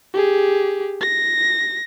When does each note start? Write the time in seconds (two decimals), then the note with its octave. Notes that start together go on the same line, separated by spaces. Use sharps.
0.14 G4 G#4
1.01 A#6